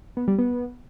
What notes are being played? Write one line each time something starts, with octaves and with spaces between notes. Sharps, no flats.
B3
G3
B3